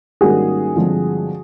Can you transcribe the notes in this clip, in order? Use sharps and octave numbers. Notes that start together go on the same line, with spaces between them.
G#2 D#3 G3 A#3 C#4 F#4 G#4
G2 D3 F3 G#3 C4